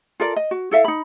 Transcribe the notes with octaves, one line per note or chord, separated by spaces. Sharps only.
F4 A4 A#4 D5
D#5
F#4
E4 A4 E5 F5
D#4 B5